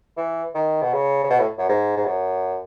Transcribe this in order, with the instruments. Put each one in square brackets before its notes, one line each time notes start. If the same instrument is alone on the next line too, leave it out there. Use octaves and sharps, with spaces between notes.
[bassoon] E3
D#3
B2
C#3
C#3
B2
A2
F#2
G#2
G#2
F#2